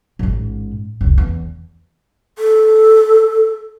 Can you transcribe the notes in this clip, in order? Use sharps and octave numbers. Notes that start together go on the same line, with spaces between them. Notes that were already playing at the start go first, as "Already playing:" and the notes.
A1 G#2
F1 C#2
E2
A4